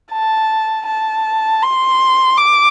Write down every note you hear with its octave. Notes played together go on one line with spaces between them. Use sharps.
A5
A5
C6
D6